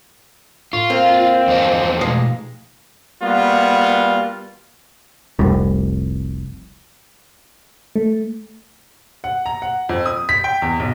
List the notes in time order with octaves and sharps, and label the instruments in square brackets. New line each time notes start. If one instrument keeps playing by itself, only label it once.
[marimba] A2 [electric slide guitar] F4
[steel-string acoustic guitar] A#3 [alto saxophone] C4
[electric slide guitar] E2 F3 D#5
[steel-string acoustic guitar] D#2 G#3 [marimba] B2 A3
[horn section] G3 A#3 B3 F4 F#4
[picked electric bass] F1 C2
[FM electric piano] A3
[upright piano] F#5
A#5
F#5
F2
D#6
B6
G5
E2
B1